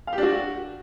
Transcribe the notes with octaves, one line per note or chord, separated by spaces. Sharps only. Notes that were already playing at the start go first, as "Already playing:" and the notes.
F5
G4
D4
F#4